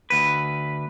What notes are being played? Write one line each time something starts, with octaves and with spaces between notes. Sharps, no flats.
D2 B4